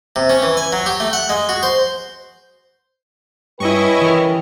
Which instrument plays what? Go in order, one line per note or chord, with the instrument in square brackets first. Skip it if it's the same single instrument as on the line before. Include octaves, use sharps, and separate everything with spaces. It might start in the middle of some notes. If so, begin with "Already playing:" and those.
[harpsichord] C3
C#4
E3
G#5
F#3
G4
A3
F#5
G#3
F#4
C5
[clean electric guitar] G2 [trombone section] C#4 G4 B4 [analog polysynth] E4 D#5 C#6
[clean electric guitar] E3 A#4